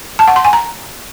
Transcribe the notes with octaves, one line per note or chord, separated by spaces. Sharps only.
A5
F#5
C6
G#5
A#5